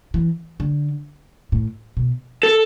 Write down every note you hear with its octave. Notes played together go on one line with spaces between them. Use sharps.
E3
D3
A2
B2
A4